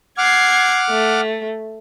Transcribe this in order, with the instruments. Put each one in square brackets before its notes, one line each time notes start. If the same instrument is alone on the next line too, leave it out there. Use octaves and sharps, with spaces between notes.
[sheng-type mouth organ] F#5 D6 F6 [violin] G#6 C7
[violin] A3